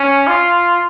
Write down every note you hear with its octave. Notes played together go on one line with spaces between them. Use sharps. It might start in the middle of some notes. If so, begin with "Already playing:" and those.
Already playing: C#4
F4